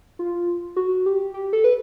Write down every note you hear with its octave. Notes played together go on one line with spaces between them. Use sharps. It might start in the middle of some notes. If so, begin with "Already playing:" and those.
F4
F#4
G4
G4
A4
B4